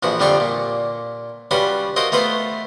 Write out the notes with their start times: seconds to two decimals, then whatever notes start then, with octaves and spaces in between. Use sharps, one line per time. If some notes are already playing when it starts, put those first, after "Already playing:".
0.03 A#1 E3 F3 F#4
0.19 F2 D3 G3 C4 F4 C#6
0.40 A#2
1.51 G3 C#4 F4 F#4 B4
1.96 F4 F#4 A#4 C5 D#5
2.12 A3 B3 F4 B4 C5